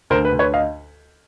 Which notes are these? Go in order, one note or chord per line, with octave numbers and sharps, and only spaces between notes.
D2 A#4 C5
B4
D2
B4 C#5
D#5 F5